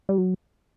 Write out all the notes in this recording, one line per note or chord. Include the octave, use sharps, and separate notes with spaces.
G3
F#3